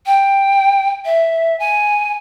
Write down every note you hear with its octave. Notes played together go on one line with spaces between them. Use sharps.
G5
E5
G#5